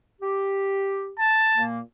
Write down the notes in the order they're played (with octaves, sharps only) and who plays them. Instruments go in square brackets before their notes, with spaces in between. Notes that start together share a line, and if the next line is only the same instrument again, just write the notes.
[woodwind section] G4
[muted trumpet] A5
[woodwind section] A#2 A#3